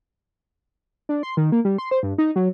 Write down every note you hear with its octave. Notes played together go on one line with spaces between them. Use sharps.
D4
C6
D#3
A#3
G3
C6
C5
G2
D#4
F#3